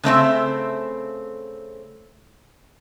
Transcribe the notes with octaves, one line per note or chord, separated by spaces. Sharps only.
C#3 A3 C4 E5